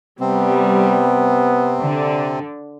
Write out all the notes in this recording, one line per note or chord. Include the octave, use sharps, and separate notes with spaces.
C3 G3 B3 C4
D3